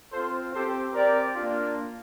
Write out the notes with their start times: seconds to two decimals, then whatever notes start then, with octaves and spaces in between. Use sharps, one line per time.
0.12 C4 F4 A4 C5
0.53 C4 G4 A4 C5
0.94 C4 G4 A#4 D5
1.34 A#3 D4 F4